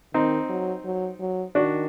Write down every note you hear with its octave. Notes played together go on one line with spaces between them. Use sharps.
D#3 C4 D#4
F#3
F#3
F#3
D#3 D4 F#4